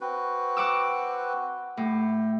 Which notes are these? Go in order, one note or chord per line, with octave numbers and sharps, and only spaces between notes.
C4 F#4 B4
F#5 D6 E6
A2 G4